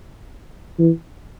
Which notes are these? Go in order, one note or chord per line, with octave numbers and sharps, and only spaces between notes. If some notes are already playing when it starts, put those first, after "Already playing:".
E3